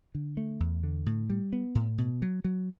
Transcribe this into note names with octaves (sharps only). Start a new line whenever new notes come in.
D3
A3
E2
D3
A2
G3
B3
A2
B2
F#3
F#3